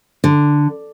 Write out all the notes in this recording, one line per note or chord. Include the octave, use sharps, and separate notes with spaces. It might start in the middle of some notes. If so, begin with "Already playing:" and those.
D3